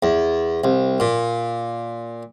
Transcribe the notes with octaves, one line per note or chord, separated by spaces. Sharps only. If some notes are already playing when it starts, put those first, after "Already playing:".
E2
C2
A#2